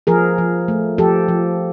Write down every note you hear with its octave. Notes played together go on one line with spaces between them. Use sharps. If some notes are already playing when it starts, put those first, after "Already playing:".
F3 G#4 A#4
F3
A3
F3 G4 A4
F3